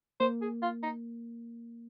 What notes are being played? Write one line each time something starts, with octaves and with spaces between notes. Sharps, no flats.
A#3 C5
G#4
F4
D#4